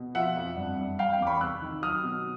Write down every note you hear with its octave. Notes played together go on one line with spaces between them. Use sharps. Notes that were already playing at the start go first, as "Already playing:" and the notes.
Already playing: B2
F3 E5 F#5
F2
G2
G2
G3 F5 G5
F5 G5
E2 D6
B5 C#6
C2 E6 F#6
D#3
F#3 D#6 F6
B2